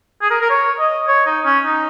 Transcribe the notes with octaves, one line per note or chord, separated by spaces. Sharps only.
G#4
A#4
A#4
C#5
D#5
C#5
D#4
C#4
D#4